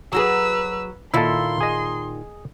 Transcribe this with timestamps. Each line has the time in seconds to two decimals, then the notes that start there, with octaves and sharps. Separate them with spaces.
0.13 F#3 F#4 G#4 B4 E6
1.14 A#2 D#3 E4 F4 A4 C6
1.61 G#4 D#5